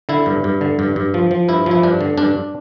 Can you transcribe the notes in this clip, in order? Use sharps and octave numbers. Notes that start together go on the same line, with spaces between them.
D3 E4
G2
G2
D3
G2
G2
F3
F3
G2 E4
F3 E4
G2 D4
D3
G2 D4